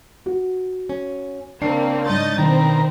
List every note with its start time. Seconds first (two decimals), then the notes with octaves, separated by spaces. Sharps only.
0.26 F#4
0.89 C#4
1.62 C#3 A#3 C4 D4 C7
2.06 G#2 D#5 C6 G6 A6
2.38 B2 D#3 C4 A#4 A#5